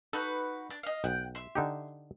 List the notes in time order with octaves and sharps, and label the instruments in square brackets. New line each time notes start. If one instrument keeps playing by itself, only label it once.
[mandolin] D#4 F#4 B4 [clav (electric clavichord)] A4
[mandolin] D4
D#5 F5
[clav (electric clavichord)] B1 [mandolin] F#5 G5
[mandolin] E5 C6
[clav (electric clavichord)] D3 D#4 G4